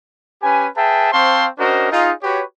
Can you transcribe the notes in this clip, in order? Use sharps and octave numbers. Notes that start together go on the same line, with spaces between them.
C#4 G4 B4 G#5
G#4 B4 E5 G5 A5
C4 C5 F5 A5 C6 C#6
C#4 D4 F#4 A#4 C5 D#5
D#4 F4 G#4
F#4 G4 B4 C#5